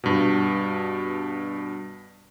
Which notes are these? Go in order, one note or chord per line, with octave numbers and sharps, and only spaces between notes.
G2 B2